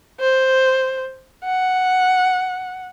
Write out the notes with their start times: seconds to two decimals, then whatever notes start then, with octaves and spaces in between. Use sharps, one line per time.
0.20 C5
1.44 F#5